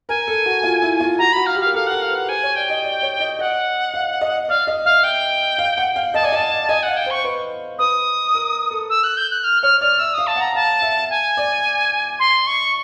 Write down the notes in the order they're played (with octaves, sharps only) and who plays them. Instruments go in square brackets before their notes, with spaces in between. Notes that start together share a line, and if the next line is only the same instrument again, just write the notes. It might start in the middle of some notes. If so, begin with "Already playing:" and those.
[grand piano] A#4 [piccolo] G#5
[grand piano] A4
F#4
F4
E4
F4
[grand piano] F#4 [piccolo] A#5
[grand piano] F#4 [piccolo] B5
[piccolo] F5
[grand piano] G4
[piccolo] F5
[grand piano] A#4
[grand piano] A4 [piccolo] F5
[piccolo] F#5
[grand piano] A#4
[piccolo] F5
[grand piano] B4
[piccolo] F#5
[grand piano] C5 [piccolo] G#5
[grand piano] C#5
[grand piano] D5 [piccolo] G5
[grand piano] D#5
D5
C#5
D#5
[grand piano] D#5 [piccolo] F#5
[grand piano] F5
D#5
[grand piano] D5 [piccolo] F5
[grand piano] D#5
[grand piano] E5 [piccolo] F5
[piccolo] G5
[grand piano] F5
F#5
F5
[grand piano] D#5 [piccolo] A5
[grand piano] D5 [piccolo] G#5
[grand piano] D#5 [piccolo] A5
[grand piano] D#5 [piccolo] G#5
[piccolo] F#5
[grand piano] F5
[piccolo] G5
[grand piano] C5
[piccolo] C#6
[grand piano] B4
[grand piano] B4 [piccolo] D#6
[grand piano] A#4
A4
[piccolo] E6
F#6
G6
F#6
F6
[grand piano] C#5 [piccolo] F6
[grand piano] D5 [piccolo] F6
[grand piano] E5 [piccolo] E6
[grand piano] F5 [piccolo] D#6
[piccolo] A5
[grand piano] F#5
[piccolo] A#5
[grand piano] F5 [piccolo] A5
[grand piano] E5
[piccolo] G#5
[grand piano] D5
[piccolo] C6
C#6